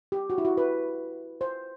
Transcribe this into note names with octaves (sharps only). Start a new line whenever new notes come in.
G4
F#4
E4
F#4
B4
C5